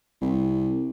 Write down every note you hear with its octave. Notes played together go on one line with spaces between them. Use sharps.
C2